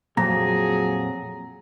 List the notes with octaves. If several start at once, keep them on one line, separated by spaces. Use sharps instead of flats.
F2 A#2 F#3 G#4 A#5 A#6